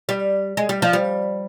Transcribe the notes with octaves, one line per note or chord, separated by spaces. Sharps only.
G3
G#3
G3
F3
G3